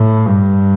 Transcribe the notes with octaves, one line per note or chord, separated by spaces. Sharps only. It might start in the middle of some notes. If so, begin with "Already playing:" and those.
Already playing: A2
G2